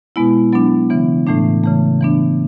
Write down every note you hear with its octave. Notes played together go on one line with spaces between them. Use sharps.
B2 G#3 B3 E4
F#3 B3 D4
C#3 E3 B3
A2 E3 A3 D4
C#3 E3 A3
E3 B3 D4